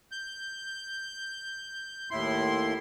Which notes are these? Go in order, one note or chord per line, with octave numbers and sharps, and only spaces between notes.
G6
D#2 A2 E4 C6